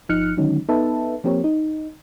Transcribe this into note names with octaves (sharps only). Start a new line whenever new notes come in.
G1 F3 D#4 F6 F#6 C#7
D3 D#3 F#3 G#3 C#4 D#4
B3 D#4 A4 B4 E5 A5
F3 A#3 C4 G4 A#4 C#5
D#4